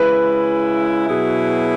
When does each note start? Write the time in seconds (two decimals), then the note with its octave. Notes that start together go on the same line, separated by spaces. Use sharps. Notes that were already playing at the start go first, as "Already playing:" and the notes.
Already playing: C#3 G#3 E4 B4
1.07 B2 F#3 E4 G#4